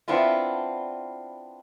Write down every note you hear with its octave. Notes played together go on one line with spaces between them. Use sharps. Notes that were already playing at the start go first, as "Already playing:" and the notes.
B3 C4 D4 E4 F4